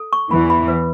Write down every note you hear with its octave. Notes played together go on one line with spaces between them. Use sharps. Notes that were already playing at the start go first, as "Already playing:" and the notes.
Already playing: A4
C#6
E2 E3 B5
B5
B4